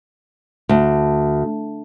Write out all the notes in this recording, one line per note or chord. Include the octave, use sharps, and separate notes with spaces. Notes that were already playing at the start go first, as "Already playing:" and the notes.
D2